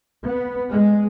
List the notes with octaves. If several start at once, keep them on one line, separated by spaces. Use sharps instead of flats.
B3
G#3